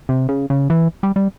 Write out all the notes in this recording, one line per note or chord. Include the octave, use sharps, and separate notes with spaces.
C3
C#3
C#3
E3
G3
G3